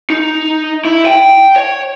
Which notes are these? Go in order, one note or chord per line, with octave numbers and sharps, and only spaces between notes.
D#4
E4
G5
C#5